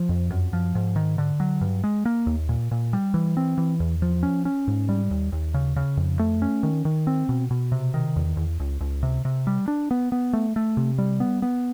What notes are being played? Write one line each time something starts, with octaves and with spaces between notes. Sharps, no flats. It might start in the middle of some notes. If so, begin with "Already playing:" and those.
Already playing: F3
F2
F#2
F3
G#2
D#3
D3
F#3
G2
G#3
A#3
D#2
A#2
A#2
G3
E3
C4
E3
E2
F3
C#4
C#4
G#2
G3
D#2
D#2
C#3
C#3
F2
A3
C#4
D#3
D#3
C4
B2
B2
C3
D#3
E2
E2
C#2
C#2
C3
C3
G3
D4
B3
B3
A3
A3
C3
G3
B3
B3